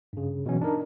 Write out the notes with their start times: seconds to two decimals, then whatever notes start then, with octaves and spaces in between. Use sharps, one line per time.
0.13 G2 C#3
0.46 B2 E3 F#3 C#4
0.61 D4 D#4 A#4